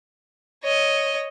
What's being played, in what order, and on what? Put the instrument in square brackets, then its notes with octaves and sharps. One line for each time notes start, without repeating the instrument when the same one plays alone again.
[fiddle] C#5 D#5